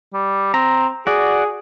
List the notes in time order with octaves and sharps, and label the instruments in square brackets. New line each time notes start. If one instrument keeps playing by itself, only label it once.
[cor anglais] G3
[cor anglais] C4 [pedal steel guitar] A#5
[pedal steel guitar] F#4 D5 [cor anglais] G#4